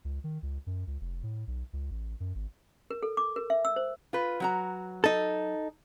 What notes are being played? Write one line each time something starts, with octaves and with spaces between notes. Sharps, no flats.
C#2
D#3
C#2
F#2
C#2
F1
A2
B1
C#2
A1
F#2
G#1
A#4
A4
D6
A#4
E5
E6
C5
F4 B4
F#3 F#4 A#5
D#4 A4